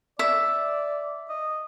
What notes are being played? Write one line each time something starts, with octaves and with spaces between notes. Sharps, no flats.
D5 E5
D#5